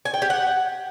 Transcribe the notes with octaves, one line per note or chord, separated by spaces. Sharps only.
G#5
G5
G4
F#5